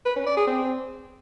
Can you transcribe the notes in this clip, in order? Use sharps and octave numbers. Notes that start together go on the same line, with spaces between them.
B4
C#4
D5
G#4
C4